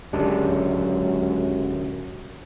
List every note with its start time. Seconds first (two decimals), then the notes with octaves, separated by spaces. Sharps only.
0.13 D1 C#2 F#2 G#3 D4 G4